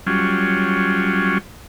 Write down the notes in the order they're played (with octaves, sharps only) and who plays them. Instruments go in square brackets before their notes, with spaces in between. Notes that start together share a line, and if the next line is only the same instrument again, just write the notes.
[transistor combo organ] F#3 G3 C#4 F4